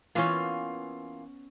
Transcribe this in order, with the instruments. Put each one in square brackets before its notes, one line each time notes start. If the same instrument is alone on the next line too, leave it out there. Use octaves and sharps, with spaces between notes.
[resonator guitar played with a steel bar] E3 A#3 F4 [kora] B3 C#4